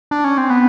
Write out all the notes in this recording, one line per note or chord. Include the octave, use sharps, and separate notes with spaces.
D4
C#4
C4
B3